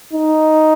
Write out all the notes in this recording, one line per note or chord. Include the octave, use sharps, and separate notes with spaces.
D#4